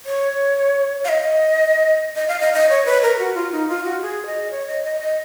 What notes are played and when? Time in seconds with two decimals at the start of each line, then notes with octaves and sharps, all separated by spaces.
0.06 C#5
1.05 F5
1.09 D#5
2.16 D#5
2.28 F5
2.40 D#5
2.54 D#5
2.70 C#5
2.86 B4
3.03 A#4
3.19 F#4
3.35 F4
3.52 D#4
3.69 F4
3.85 F#4
4.02 G#4
4.26 D#5
4.51 C#5
4.67 D#5
4.84 D#5
5.01 D#5